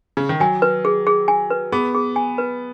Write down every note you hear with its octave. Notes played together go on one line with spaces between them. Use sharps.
C#3
D#3
F#3 G#5
B4
G#4
G#4
G#5
B4
B3 G#4
G#4
G#5
B4